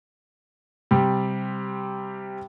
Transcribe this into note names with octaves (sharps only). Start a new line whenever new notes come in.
C3 G3